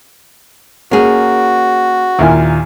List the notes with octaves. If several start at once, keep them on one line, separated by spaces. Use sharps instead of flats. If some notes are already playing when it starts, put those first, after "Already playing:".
A#3 C#4 F#4 G#4
D#2 A#2 E4 A#4 G#5